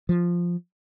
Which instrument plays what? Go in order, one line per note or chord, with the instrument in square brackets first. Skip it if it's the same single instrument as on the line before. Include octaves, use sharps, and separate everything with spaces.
[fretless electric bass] F3